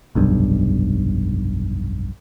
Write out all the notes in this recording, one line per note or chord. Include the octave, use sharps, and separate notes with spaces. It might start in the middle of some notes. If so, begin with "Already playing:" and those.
F1 B1 G2